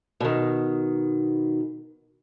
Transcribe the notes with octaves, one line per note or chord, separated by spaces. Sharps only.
B2 D#3